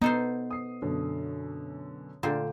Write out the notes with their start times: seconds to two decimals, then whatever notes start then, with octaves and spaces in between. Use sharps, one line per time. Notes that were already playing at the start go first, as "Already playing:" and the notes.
0.02 B3 D#4 A4 C5
0.51 D#6 C7
0.82 F#2 B2 D3
2.23 A#2 D3 A3 C4 F4